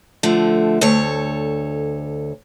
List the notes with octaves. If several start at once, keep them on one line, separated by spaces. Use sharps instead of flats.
D3 F3 A3
D2 A4 C#5